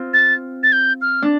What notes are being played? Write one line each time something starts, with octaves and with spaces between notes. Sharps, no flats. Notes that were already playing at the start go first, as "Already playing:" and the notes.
Already playing: C4 F4
A6
A6
G6
F6
D4